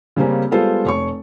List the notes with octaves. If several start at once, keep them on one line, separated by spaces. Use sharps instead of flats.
C#3 G3 A#3 C4 C#4
G3 G#3 B3 F4 A4 C5
F1 C#5 C#6